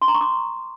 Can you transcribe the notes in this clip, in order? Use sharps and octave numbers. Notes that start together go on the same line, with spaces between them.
C6
A#5
C#6
D6